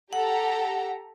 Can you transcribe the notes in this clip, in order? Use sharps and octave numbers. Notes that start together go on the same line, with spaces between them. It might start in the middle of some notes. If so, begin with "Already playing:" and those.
G4 A4 F#5 A#5